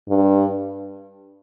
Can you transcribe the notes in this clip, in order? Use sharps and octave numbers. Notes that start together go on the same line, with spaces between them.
G2